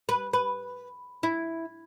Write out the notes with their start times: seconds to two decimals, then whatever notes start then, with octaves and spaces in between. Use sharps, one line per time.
0.09 B4
0.33 B4
1.23 E4